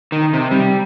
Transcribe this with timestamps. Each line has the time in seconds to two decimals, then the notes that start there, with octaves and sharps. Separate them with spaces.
0.12 D#3
0.33 C3
0.51 G3